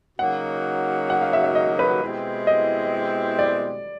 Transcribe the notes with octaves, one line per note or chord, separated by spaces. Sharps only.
C#3 F#3 A#3 D#4 F#4 F#5
F#5
F5
E5
E5
D#5
B4
B2 G#3 C4 E4 G4
D#5
D5